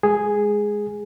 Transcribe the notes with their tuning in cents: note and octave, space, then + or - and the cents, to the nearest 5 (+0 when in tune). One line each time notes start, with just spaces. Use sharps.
G#3 +0 G#4 +0